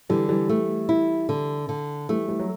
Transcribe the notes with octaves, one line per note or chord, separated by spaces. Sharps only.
D3 E3 G3
E3 G3
A3
E4
D3
D3
E3 G3 A3
E3 G3
F#3